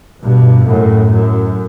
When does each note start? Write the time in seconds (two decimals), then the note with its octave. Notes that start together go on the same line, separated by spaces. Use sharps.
0.22 G2 B2
0.66 F#2 A2
1.11 F#2